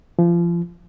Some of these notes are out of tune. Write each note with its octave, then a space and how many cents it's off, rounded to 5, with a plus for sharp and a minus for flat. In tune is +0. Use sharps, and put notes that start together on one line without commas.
F3 -30